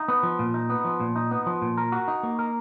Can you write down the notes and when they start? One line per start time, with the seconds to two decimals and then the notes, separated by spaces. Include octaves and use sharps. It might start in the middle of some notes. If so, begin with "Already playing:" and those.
Already playing: D#4
0.08 B3
0.23 F3
0.39 A#2
0.54 D#4
0.70 B3
0.85 F3
1.00 A#2
1.16 D#4
1.31 B3
1.46 F3
1.62 A#2
1.77 A#4
1.92 F#4
2.08 D#4
2.23 A#3
2.39 A#4